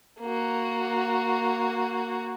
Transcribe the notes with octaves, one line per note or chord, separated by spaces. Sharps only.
A#3 F#4